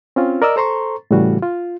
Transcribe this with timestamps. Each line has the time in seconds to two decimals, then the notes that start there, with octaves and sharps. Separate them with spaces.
0.16 C4 C#4 F4
0.42 A#4 D5 D#5 E6
0.56 A4 C5 A#5 C6 C#6
1.11 A2 C#3 E3 G3 F#4
1.42 F4